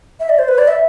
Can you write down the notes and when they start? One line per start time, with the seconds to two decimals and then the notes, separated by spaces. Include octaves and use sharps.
0.20 E5
0.29 D5
0.39 C5
0.48 B4
0.58 D5
0.68 E5